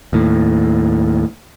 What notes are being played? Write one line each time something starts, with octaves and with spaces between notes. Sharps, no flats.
D#2 A2